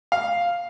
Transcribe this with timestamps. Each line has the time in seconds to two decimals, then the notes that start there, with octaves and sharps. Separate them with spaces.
0.12 F5